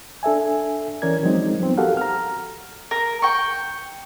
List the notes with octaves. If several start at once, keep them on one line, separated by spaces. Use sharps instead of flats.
D4 A4 E5 G#5
E3 C#4 A#4 D5 G#6
F3 F#3 G#3 C4 D#4
F3 G3 B3 C4
F#4 G4 A4 A#4 F5 F#5
A#5 F6
A#4
G5 C#6